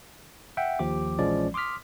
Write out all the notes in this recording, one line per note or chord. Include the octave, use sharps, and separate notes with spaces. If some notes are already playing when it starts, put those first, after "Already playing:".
E5 F#5 G5
D#2 F3 G4 D6
A#1 E3 F3 G#3 C#4 D5
C6 D6 D#6 F6 B6